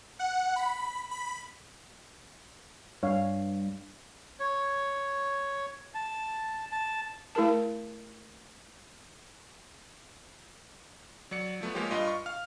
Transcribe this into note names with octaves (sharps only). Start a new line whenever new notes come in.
F#5
B5
B5
G2 C#5 F5
C#5
A5
A5
A3 E4 G#4 A#4 A5
F#3 D5 C#7
F3 A3 B3
F3 G#3 A#3 F4 G4 C#5
G2 F4 D#5
C#6
F5 F6